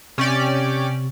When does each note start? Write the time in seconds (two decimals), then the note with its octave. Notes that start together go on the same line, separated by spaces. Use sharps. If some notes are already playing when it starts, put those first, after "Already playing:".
0.18 C3 C#4 G4 D5 C#6